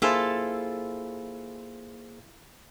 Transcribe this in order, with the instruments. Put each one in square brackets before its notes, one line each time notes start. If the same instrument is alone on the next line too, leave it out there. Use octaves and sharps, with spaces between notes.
[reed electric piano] A#3 G#4 C5 [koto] E4 F4 A4